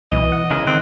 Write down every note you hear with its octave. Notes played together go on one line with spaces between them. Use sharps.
C2 B2 E3 D#5
F#5
C#3 G#3 E4 A#4
D#3 C4 F#6